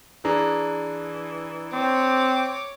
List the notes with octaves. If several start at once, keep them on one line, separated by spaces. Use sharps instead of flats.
E3 D4 G#4 A#5
C4 C#5 D6